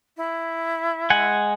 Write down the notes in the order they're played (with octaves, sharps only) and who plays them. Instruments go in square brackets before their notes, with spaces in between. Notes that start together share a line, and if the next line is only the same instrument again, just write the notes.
[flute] E4
[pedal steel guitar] G#3 F#5 G#5